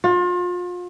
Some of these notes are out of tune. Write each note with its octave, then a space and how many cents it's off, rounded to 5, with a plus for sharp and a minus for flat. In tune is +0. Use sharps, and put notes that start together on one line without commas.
F4 +35